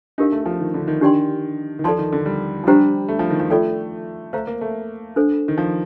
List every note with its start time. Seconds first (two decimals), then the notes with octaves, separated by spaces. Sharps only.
0.18 D4 D#4 G4 A#4 F5
0.32 A3
0.46 F3
0.60 D#3
0.74 D3
0.88 D#3
1.01 D4 G4 D5 G5 C6
1.79 D#3
1.84 F3 A4 D5 A5 C6
1.98 D#3
2.13 D3
2.26 G3
2.63 F3
2.67 G3 D4 G4 C5 G5 A#5
3.08 A3
3.19 F3
3.30 D#3
3.40 F3
3.50 A3 F4 A4 D5 G5
4.33 A3 C5 F5 A#5
4.47 A#3
4.61 A3
5.16 D4 A4 C5
5.48 D#3
5.58 F3